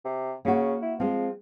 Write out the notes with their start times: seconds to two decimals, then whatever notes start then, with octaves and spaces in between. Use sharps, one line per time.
0.05 C3
0.45 C#3 A#3 F#4
0.82 E4
1.00 F3 G#3 C4